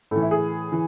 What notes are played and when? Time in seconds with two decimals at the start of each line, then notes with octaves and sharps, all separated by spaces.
0.11 A2 E3 A3
0.22 E4
0.31 G#4
0.72 E3